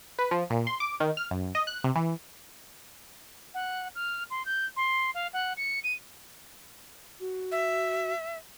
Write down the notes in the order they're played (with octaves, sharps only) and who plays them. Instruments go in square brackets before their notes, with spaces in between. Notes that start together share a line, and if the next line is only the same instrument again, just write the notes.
[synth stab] B4
F3
A#2
C6
D6
D#3
F6
F#2
D#5
F#6
C3
E3
[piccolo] F#5
F6
C6
G6
C6
F5
F#5
C#7
D#7
[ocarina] F#4
[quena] E5